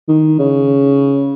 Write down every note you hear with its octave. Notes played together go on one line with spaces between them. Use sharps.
D#3
C#3